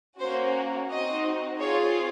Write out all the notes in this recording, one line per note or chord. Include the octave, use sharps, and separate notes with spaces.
A#3 C#4 F#4 C5
C4 D#4 F#4 D#5
C4 F4 G#4 C#5